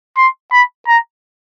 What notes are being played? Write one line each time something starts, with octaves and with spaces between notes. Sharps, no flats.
C6
B5
A#5